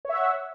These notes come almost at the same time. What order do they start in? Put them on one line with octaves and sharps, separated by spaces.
C#5 E5 F#5